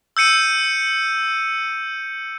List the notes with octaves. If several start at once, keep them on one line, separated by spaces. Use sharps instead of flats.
E6 G6 C#7 D#7